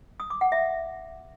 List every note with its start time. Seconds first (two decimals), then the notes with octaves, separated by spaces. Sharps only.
0.20 D#6
0.30 D6
0.41 F#5
0.52 E5